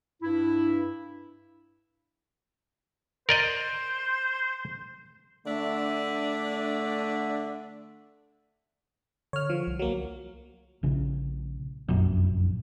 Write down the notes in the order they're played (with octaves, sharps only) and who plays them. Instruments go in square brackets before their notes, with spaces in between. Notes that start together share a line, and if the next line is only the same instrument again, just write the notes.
[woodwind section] G2 E4
[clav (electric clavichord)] A#4 D5 D#5 [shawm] C5
[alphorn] D3 [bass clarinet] A3 [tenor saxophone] D4 [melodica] E5
[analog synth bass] D3 [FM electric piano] C#5 F6
[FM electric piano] F3
[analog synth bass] C2
[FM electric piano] F#3 A#3
[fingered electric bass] A#1 C#3
F1 A#1 F#2 A#2